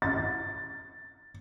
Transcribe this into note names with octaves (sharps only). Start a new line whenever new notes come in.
A6